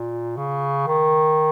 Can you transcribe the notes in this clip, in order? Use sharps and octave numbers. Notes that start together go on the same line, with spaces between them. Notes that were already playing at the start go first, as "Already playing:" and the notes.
Already playing: A#2
C#3
D#3